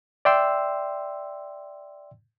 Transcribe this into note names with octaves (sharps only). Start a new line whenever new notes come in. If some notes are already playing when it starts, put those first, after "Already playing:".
D5 E5 G5 C6 E6